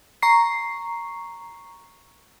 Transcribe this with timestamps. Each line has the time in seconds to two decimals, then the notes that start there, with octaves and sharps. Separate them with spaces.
0.22 A#5 C#6 C7